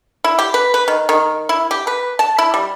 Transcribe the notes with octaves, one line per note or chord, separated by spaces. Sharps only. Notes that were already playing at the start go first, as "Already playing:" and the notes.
E4
G4
B4
B4
D#3
D#3
E4
G4
B4
A5
E4
G3